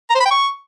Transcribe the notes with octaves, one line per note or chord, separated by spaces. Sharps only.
A#5
C5
B5
G5
C#6